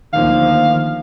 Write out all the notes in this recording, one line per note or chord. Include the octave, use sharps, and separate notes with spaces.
D2 D#3 F3 A#3 F5